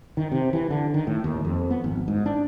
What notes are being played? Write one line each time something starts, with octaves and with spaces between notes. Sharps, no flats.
D#3
C3
E3
D3
D#3
A2
D#2
F2
B3
G#1
G#2
D4